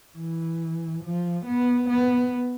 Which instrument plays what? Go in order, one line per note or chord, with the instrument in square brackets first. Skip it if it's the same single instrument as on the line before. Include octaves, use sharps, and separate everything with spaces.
[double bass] E3
F3
B3
B3